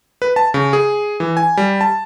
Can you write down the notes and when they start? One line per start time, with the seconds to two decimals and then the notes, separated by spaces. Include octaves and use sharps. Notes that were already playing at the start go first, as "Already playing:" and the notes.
0.22 B4
0.36 A5
0.54 C#3
0.73 G#4
1.20 E3
1.37 G#5
1.57 G3
1.81 A5